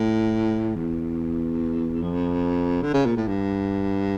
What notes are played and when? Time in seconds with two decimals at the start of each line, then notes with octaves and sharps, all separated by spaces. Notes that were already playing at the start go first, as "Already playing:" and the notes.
Already playing: A2
0.75 E2
2.02 F2
2.83 D3
2.94 C#3
3.06 A#2
3.16 A2
3.28 G2